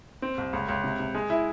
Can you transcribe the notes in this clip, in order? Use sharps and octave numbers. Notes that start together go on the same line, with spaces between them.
C4
C2
C#2
C#2
C3
C3
G#3
E4